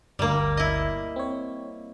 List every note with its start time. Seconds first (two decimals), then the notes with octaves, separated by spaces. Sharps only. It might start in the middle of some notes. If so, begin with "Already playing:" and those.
0.19 G1 D2 G3 A#3
0.57 E4 D#5
1.16 C4 C#5